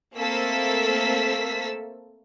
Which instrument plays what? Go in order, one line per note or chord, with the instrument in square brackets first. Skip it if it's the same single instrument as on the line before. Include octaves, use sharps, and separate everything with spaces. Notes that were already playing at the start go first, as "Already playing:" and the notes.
[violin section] A3 A#3 C4 A4 E6 B6